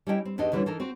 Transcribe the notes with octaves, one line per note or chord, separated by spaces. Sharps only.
G3 C#4 E4 D#5 F#5 G5
C4
E2 D4 D#4 G4 D#5
D2 D3 E3 G3 C#4 E4
E3 D#4 A4 A#4
C4 F#4